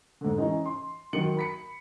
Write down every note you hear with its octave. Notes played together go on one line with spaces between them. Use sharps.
G#2 D3
E3 C#4 D#4
C6
D#3 F#3 C#7 F#7
B5 B6 C#7